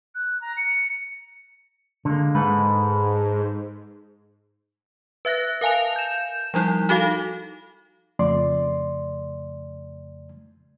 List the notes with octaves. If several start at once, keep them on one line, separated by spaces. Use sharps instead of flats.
F#6
A#5
C#7
D3 G#3 A#3
G#2 A4 B4
B4 E5 F#6 A#6
A#4 F5 G#5 A5 F7
G6 E7
F3 G3 D#4 E4
D#4 F#4 A4 F5
F2 C#3 A3 D5 C6